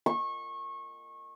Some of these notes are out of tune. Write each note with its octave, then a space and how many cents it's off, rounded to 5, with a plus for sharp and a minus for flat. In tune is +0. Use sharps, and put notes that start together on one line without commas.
C#6 -25